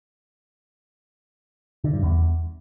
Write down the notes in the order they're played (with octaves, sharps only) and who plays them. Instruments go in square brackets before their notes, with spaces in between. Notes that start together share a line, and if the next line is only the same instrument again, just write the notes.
[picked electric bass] D3
G2
E2